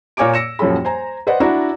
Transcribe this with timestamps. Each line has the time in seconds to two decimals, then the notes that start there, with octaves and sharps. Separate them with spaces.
0.17 A#2 A#3 C#5 G#5 D6 D7
0.34 E6 A#6 C#7 E7
0.59 D#1 F#2 F3 C#4 A4 B5
0.84 C5 G#5 A#5
1.27 B4 C5 D5 D#5 F#5
1.40 D4 E4 F#4 A#5